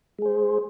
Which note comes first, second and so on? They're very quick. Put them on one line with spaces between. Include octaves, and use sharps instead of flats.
G#3 G#4 C5